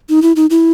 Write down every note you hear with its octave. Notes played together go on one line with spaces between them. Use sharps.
D#4
E4
D#4
E4